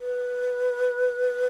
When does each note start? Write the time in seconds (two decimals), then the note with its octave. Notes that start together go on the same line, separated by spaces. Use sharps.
0.01 B4